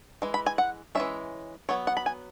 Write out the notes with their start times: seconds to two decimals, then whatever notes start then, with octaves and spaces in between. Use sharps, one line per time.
0.22 E3 G#3
0.34 B5
0.46 G#5
0.58 F#5
0.95 E3 G#3 C#4 E5
1.69 F#3 B3 C#5
1.87 F#5
1.97 B5
2.06 G#5